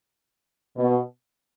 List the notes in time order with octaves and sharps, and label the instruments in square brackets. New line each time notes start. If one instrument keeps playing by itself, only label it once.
[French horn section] B2